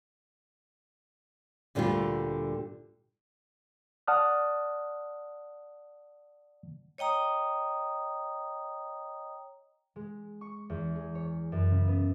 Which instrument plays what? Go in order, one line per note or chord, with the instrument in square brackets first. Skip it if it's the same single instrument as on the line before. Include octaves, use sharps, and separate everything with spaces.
[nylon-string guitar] D2 A#2 D3 G3 A3 F4
[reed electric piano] D5 F#5 A5 D#6 F6 F#6
[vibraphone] C#5 D#5 G5 A#5 D#6
[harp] G#3
C#6
E2
G#4
C#5
F#2
C#3
B3